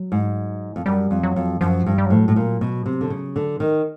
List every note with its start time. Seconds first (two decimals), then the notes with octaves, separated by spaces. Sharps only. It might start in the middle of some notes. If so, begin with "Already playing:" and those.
Already playing: F#3
0.12 G#2
0.76 F2
0.86 F#2 G3
1.11 F2
1.23 F#3
1.36 F2
1.61 F#2 F3
1.86 G2
1.98 G3
2.06 F#3
2.10 A2 F3
2.20 F#3
2.28 A2
2.36 A#2
2.61 B2
2.86 C3
3.01 D3
3.10 C#3
3.36 D3
3.60 D#3